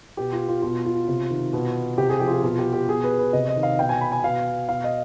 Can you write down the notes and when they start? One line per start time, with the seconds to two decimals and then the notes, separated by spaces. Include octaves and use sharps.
0.17 B2 G4
0.32 F4
0.49 F4
0.62 B2 F4
0.85 F4
1.08 C3
1.30 D#3
1.53 B2
1.98 C3 G4
2.09 G#4
2.20 F3 G4
2.28 F4
2.32 G4
2.43 B2 F4
2.59 G4
2.73 G4
2.88 B2 G#4
3.04 B4
3.18 B4
3.33 C3 D#5
3.49 D#5
3.56 D#3
3.63 F5
3.79 B2 G5
3.89 G#5
4.01 B5
4.12 G#5
4.24 B2 F5
4.69 B2 F5
4.84 D#5